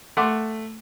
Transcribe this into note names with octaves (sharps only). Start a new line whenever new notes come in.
A3 F#5 C6 D6